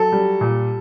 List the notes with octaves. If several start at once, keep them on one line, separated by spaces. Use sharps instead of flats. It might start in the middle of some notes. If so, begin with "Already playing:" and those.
Already playing: F#3 A4
G3
A#2